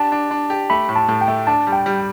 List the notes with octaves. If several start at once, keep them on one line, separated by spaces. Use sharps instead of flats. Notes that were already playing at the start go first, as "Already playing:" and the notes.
Already playing: D4 G4 A5
D4
D4
G4
A3 B5
A2
A5
A2
G5
A3
D4 A5
G3
G5
G3